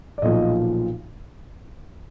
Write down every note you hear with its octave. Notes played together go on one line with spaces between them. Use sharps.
D5
B1 A#2 F3 D#5